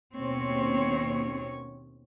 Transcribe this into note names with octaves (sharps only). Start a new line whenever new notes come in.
D#2 B2 A#3 C4 C#4 C#5